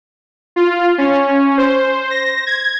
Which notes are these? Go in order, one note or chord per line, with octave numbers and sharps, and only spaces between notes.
F4
C#4
C5
A#6
G#6